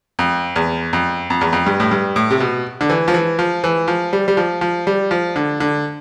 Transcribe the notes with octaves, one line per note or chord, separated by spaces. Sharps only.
F2
E2
F2
F2
E2
F2
G2
A2
G2
A2
C3
B2
D3
E3
F3
E3
F3
E3
F3
G3
G3
F3
F3
G3
F3
D3
D3